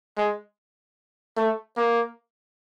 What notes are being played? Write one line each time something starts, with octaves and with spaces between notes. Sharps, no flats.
G#3
A3
A#3